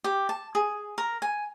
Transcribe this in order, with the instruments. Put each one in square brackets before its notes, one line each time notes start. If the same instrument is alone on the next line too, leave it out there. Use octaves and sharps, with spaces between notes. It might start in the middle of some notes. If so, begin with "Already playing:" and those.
[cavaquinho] G4
A5
G#4
A#4
G#5